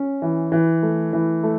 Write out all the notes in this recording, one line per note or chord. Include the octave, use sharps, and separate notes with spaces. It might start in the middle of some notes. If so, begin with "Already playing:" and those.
Already playing: C#4
E3
E3
A3
E3
A3